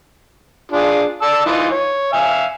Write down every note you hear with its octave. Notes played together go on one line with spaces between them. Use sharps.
D4 F4 G#4
D5 A5 E6
E3 D#4 F4
C#5
E5 F5 G#5